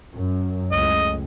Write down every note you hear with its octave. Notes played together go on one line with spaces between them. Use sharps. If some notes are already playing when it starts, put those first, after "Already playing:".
F#2
C#2 A2 G#3 D#5